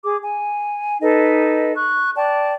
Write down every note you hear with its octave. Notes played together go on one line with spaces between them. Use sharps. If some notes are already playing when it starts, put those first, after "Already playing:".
G#4 D6
G#5
D#4 A4 B4 D#5
C#6 F#6
D5 G5 A5